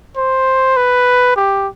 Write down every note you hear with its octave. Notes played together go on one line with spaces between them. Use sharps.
C5
B4
G4